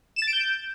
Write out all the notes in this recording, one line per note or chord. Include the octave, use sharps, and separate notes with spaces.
E7
A6
D7
G6